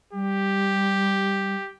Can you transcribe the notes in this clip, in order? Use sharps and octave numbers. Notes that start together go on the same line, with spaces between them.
G3 G4